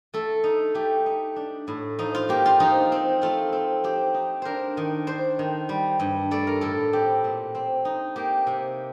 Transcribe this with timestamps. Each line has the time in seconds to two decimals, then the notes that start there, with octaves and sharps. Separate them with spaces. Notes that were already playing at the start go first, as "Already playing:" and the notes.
0.14 A3 A4
0.44 D#4
0.74 A3 G4
1.06 D#4
1.36 D4
1.68 A2
1.99 F3 D#4
2.15 F4
2.29 A#3 G4
2.46 F4
2.60 F3 D#4
2.92 C4
3.22 A3 F4
3.52 C4
3.84 C4 G4
4.14 D#4
4.42 D4 A#4 C5
4.77 D#3
5.07 D4 C5
5.39 D#3
5.69 G3
6.00 G2
6.31 A3 D5
6.47 A#4
6.61 A2 A4
6.93 C4 G4
7.24 A#2
7.55 C4
7.85 D#4
8.16 A#3 G4
8.47 C3